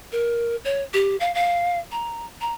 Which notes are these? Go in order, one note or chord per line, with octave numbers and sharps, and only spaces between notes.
A#4
C#5
G4
F5
F5
A#5
A#5